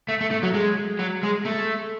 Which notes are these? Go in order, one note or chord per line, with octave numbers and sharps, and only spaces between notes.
A3
A3
A3
F#3
G#3
F#3
G#3
A3